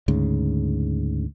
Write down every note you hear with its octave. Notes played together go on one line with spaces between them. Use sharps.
D2 G#2 C#3